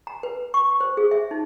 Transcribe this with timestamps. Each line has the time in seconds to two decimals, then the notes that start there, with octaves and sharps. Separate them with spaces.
0.07 A#5
0.23 B4
0.54 C#6
0.81 C5
0.97 G#4
1.11 E5
1.31 D#4